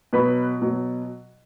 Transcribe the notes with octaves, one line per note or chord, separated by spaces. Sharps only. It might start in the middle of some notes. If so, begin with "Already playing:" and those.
B2 F#3 B4
B2 F#3